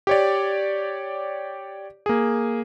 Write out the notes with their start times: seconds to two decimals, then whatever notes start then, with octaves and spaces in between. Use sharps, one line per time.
0.07 G4 C#5 D5
2.06 A#3 G#4